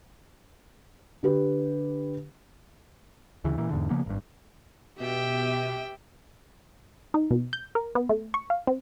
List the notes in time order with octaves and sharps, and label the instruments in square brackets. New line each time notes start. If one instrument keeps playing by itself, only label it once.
[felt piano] D3 G4 B4
[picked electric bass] D2 C#3 E3
A#2 E3
E2 G#2 D3
C#3 F3 A#3 B3
G#1 G2
[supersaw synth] B2 [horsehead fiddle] G4 [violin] E5 G5
[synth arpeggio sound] D#4
B2
G6
A#4
B3
A3
C#6
F5
C4